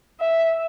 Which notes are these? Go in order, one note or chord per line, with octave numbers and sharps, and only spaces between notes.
E5